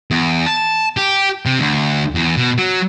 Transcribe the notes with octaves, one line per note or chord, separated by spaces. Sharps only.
E2
A5
G4
C3
D2
E2
B2
F#3